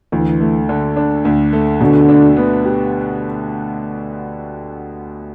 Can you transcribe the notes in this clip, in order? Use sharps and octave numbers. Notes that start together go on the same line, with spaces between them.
D2 E3
A3
D3
D4
D2
A3
B2 D3
D4
B3
G4